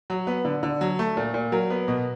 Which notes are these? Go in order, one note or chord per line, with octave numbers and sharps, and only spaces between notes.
F#3
B3
D3
D3
F#3
A3
A#2
A#2
F#3 A#4
B3
B2